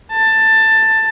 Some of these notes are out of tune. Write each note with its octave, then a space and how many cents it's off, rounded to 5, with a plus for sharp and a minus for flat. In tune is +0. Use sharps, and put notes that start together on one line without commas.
A5 +10